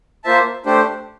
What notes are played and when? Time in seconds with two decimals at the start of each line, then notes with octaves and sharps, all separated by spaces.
0.24 A#3 F4 C5 E5 A5
0.66 A3 D4 G4 C5